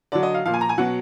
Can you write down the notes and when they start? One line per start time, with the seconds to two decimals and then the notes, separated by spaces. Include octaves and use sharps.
0.12 D3 F#3 D5
0.23 D#5
0.34 F5
0.46 A#2 F3 F5
0.54 G#5
0.61 A#5
0.69 G#5
0.78 B2 F#3 F#5